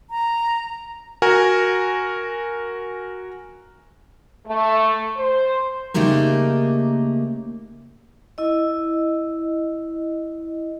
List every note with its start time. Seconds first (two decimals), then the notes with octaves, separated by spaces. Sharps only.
0.10 A#5
1.22 F#4 A#4 G#5
4.47 A3
5.16 C5
5.94 C#3 A3 A#3 D#4 G4 A#4
8.38 E4 D#5